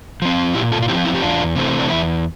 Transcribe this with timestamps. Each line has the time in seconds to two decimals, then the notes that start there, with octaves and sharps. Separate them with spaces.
0.22 F3 C4
0.54 A#2 E4 G4
0.72 F4 A4
0.82 F4
0.88 F3 C4 E4 G4
1.05 E4
1.14 G4
1.21 E2 D4 F4
1.55 C3 E3 A3 C4
1.79 D4
1.90 E2 E4